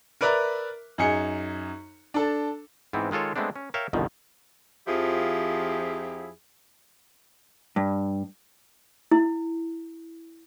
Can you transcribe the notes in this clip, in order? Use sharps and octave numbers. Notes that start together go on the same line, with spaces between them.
A#4 B4 D5 E5 A#5
F#2 D#4 G#4 C#7
D4 A4
G#2 E3 B3 C4
D#3 G#3 F4 A4 C#5
G#3 A3 B3 C4 D4
C#4
A#4 C#5 E5 F5 G5
G1 C2 B2 D#3 F3
F2 F3 E4 G4 G#4
G2
E4